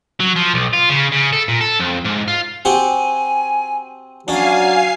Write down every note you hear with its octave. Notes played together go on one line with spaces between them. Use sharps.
F#3
F3
B1
F4
C#3
C#3
A4
A#2
A4
F2
G#2
F4
C4 F#4 G4 G#5
F#3 C#4 D4 D5 F5 G#5 C7